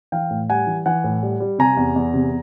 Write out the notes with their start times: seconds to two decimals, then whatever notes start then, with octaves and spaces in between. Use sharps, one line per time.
0.12 E3 F5 G5
0.31 A2
0.50 G3 F#5 G#5
0.67 E3
0.86 E3 F#5 G#5
1.04 A2
1.23 G3
1.40 G3
1.59 C3 G#5 A#5
1.77 E2
1.96 E2
2.14 C3